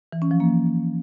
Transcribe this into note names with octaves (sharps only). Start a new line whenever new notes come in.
E3
C#4
F3
A#3